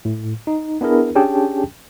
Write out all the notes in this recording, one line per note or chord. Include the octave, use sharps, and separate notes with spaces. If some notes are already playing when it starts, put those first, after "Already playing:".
A2
D#4
B3 D4 E4 G#4 A#4
C#4 D4 G4 G#4 G5 A5